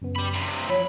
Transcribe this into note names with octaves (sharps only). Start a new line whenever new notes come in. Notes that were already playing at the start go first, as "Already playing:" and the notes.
F#2 C#3 B3
G4 B5
G2 C3
A#5
F3 C#5 B5